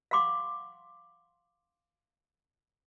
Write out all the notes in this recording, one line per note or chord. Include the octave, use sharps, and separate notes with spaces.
F5 F#5 C6 D6